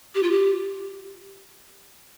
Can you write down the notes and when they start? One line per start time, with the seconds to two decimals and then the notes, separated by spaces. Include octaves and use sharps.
0.15 G4
0.23 F4
0.31 G4